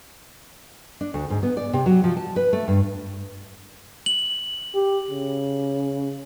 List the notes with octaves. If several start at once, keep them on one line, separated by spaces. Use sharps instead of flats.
D4
D2
G#2
B3
D5
C3
F#3
F3
A5
B4
A3
G2
F#7
G4
C#3